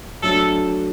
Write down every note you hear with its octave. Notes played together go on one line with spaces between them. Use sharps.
F#3 A3 D4 A4